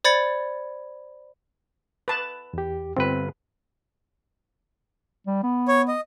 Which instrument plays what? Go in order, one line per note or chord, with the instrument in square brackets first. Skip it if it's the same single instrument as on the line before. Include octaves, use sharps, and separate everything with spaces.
[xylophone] C5 D5 B5 G#6 A6 C#7
[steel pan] B4 A5
[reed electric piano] E2 G4
[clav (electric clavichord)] G1 B4 [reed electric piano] C4
[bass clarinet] G3
B3
[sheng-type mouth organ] C#5
D#5